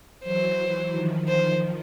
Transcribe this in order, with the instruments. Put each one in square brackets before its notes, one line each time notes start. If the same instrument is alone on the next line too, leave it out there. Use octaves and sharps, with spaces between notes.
[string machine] E3 F#3 [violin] C5
[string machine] E3 F#3
D#3 F3
[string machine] D#3 F3 [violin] C5